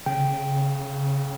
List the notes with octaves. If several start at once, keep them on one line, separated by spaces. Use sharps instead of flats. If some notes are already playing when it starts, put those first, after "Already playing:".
C#3 G5